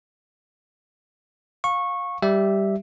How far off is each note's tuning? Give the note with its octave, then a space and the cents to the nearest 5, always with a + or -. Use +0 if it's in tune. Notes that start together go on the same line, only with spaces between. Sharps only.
F5 +25 C#6 -15
G3 +0 G4 -5 E5 +0